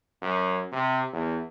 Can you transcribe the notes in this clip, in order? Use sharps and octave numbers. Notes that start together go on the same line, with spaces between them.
F#2
C3
E2